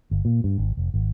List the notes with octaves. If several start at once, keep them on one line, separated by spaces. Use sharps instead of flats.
G1
A#2
G2
G#1
F1
G#1